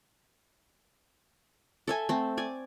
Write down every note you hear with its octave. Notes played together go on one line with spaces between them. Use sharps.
A4 E5 G#5
A3 C4
D5 G#5